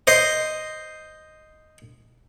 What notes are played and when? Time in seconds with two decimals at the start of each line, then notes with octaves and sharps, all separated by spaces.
0.07 C5 D#5